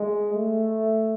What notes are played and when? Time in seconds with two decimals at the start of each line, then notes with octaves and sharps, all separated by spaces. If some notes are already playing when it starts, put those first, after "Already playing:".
Already playing: G#3
0.35 A3